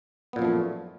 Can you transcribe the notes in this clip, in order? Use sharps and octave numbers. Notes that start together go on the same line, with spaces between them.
F#2 A#2 F3 A3 B3